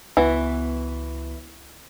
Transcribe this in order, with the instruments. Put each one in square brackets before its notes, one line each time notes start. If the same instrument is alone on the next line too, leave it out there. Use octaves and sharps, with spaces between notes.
[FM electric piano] C#2 B3 E4 [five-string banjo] E3 F#4